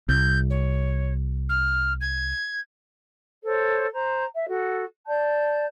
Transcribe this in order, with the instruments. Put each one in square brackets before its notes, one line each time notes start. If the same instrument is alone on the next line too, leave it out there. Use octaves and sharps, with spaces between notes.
[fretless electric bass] C2 [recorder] G6
[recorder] C#5
F6
G#6
[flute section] A4 C5 C#5
C5 A#5
E5
F#4 A4
D5 A5 G6